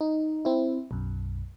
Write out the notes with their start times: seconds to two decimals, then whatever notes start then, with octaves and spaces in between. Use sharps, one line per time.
0.01 D#4
0.45 C4 E4
0.91 B1 F#2